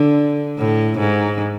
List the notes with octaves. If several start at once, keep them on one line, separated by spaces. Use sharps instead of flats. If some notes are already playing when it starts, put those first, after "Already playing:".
Already playing: D3
A2
G#2